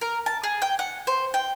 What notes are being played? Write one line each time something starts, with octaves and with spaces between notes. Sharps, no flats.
A#4
A5
G#4
G5
F#5
C5
G5